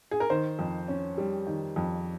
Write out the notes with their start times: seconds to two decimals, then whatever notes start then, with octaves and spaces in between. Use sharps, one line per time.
0.11 G#4
0.20 A#4
0.30 D#3 C5
0.59 F2
0.88 C#4
1.18 G3
1.47 D#3
1.76 F2